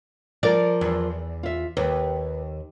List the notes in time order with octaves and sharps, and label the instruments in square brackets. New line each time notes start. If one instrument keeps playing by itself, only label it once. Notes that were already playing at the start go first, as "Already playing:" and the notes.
[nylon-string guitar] F3 A#4 [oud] D5
[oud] E2
[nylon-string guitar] F4 E5
[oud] D#2 [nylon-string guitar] B4